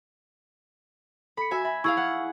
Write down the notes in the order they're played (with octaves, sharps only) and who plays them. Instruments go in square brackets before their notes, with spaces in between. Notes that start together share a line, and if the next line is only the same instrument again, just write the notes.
[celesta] A4 C#7 [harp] B5
[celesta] F#4 [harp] E5 G#5
[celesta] E5 G#5 [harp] B5
[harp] E4 G#4 F5 [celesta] C#6 E6 G#6
[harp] F#5